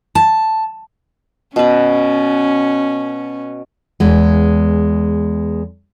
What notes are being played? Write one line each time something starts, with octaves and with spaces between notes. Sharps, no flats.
A5
B2 C#4 B4
E2 G#3